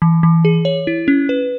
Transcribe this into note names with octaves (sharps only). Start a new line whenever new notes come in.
E3
E3
G#4
C#5
E4
C#4
B4